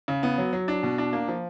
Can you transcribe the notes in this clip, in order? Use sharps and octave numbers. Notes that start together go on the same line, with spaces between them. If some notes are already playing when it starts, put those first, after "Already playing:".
C#3
B3
F#3
F#3
D4
B2
D4
A#3
F3